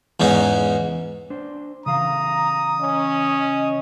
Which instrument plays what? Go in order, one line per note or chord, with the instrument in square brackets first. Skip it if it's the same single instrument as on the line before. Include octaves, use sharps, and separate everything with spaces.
[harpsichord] E2 G#2 C#4 D#4
[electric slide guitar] D4 C5
[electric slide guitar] C#3 E3 F5 [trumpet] A#5 [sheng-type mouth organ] D#6
[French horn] C#4 [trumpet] D#5